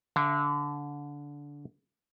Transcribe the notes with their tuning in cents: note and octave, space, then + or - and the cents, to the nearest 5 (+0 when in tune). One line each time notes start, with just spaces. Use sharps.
D3 -20 E5 +40